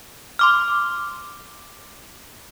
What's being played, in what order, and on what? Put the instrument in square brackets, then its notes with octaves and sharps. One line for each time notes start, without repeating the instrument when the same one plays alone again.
[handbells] C6 D6 F6